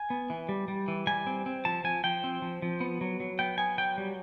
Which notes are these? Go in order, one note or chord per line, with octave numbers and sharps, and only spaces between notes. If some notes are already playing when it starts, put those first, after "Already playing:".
Already playing: G#5
B3
E3
G3
G3
E3
G3 G#5
C4
C4
F3 A5
F3 G#5
F3 G5
C4
F3
F3
B3
F#3
F#3
B3 G5
B3 G#5
F#3 G5
G3